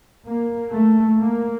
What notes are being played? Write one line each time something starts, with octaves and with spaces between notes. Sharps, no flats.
A#3
A3
A#3